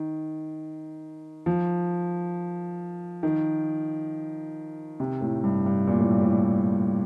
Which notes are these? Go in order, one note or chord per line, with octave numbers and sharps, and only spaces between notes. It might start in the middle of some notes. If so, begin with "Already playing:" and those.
Already playing: D#3
F3
D#3
C3
A2
G2
G2
A#2
A2
G2
A2